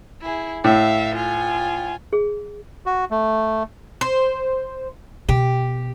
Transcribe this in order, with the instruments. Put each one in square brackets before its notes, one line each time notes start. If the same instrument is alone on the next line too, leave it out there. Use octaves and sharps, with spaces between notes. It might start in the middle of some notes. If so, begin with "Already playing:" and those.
[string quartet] E4 G#4
[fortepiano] A2 [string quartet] E5 F5
[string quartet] F4 G#5
[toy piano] G#4
[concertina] F#4
A3
[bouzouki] C5
[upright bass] B2 [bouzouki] G4